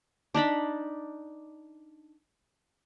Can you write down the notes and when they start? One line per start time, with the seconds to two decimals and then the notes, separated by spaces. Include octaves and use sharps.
0.34 D4 D#4 D5 B5